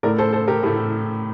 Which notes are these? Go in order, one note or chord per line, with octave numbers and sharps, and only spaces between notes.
A2 A3 A#4 D5
A4 C5
A4 C5
G4 A#4
A2 A3 G4